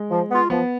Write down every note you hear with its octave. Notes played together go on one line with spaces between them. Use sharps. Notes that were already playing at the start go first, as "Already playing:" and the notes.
Already playing: G#3
F3
B3 F4
F3 B3